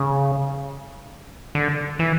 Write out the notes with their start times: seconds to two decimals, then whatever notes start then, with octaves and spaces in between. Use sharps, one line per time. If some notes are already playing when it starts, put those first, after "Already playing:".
Already playing: C#3
1.55 D3
1.99 E3